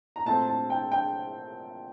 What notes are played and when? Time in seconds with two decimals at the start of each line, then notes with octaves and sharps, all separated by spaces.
0.16 A#5
0.25 A#2 A3 C4 A5
0.48 A5
0.70 G5
0.92 G5